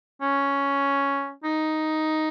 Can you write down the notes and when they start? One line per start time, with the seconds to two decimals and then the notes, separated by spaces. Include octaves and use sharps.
0.21 C#4
1.44 D#4